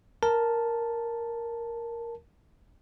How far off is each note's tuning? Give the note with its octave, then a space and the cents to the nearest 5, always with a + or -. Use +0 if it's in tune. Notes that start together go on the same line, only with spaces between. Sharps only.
A#4 +0 A5 +0